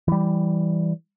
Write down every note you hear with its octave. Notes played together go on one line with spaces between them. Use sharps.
E3 G3